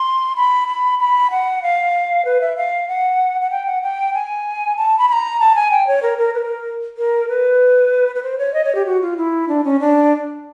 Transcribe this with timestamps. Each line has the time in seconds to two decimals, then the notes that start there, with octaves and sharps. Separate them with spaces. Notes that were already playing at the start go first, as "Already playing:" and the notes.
Already playing: C6
0.36 B5
0.68 B5
0.99 B5
1.31 F#5
1.63 F5
2.25 B4
2.41 E5
2.57 F5
2.88 F#5
3.41 F#5
3.51 G5
3.66 F#5
3.82 G5
4.14 G#5
4.77 A5
4.98 B5
5.09 B5
5.13 A#5
5.40 A5
5.55 G#5
5.71 G5
5.87 C#5
6.03 A#4
6.18 A#4
6.34 B4
6.39 A#4
6.97 A#4
7.28 B4
8.15 B4
8.23 C5
8.38 C#5
8.54 D#5
8.64 C#5
8.75 G4
8.86 F#4
9.01 F4
9.17 E4
9.48 D4
9.64 C#4
9.80 D4